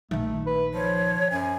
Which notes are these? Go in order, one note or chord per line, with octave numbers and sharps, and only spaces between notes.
A#1 D#3 A3
B4
F3 C#5
F#2 G#5